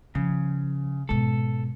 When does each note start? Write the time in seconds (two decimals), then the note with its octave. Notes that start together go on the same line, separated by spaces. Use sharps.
0.15 C#3 F3
1.09 G#2 B2 A4